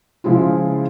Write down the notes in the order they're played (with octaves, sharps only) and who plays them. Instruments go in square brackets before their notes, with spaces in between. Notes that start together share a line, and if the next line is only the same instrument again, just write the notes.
[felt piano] C#3 F3 G#3 E4 F4